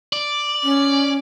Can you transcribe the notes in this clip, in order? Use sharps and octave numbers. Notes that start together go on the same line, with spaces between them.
D5
C#4